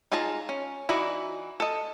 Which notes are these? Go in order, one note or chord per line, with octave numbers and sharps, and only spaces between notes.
D#4 F4 G#4 A5 A#5
C#4
E3 D#4 F#4 D5 A#5
A4 D#5